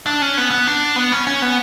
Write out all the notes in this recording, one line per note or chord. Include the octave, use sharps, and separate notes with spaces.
D4
C#4
B3
B3
D4
B3
C#4
C#4
B3